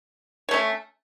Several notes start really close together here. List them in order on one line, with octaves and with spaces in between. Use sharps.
C#5 A3 C#4